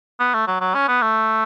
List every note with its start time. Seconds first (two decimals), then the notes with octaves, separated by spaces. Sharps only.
0.20 B3
0.34 A3
0.47 F#3
0.61 F#3
0.75 C#4
0.88 B3
1.02 A3